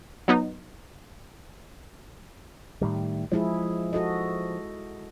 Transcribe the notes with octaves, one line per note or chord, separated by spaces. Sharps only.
F#3 B3 D#4
A2 D#3 G3
F3 G#3 E4 G#4
F#4 A4 D#5